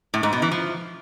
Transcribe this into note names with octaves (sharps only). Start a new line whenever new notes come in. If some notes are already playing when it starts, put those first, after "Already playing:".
A2
G#2
B2
E3
F3